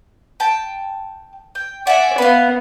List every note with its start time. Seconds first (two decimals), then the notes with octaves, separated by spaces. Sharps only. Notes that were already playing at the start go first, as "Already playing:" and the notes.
0.40 G5 A5
1.55 G5
1.87 D5 E5 F#5 G#5
2.18 B3 B4 F5